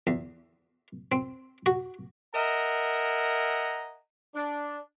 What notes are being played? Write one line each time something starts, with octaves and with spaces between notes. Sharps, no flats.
E2
C4
F#4
A#4 D#5 E5 F#5 G#5 A#5
D4